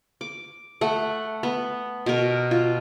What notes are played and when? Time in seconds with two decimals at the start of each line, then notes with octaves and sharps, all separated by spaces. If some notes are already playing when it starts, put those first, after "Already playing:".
0.21 D6
0.81 A3 F#5
1.43 B3
2.06 B2 A#4
2.51 F4